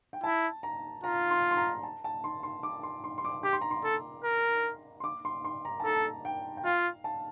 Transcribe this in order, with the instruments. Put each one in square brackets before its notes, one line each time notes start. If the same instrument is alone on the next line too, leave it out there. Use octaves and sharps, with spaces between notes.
[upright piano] G5
[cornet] E4 [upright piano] A5
[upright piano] A#5
[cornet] F4 [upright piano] A#5
[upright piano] C6
C6
A#5
A5
A5
C6
C6
D6
C6
C6
C6
D6
[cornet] G4 [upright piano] D6
[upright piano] C6
A#5
C6
[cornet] A4
A#4
[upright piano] C6
D6
C6
C6
A#5
A5
[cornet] A4 [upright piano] A#5
[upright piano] G5
G5
[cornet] F4 [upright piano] F5
[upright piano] A5